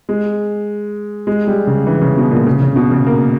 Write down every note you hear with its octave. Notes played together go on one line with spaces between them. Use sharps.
G#3
G#3
G3
C#3
E3
C#3
B2
A#2
C#3
C#3
B2
C#3
A#3